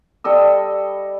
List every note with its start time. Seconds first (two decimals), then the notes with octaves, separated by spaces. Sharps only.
0.24 G3 A4 D#5 E6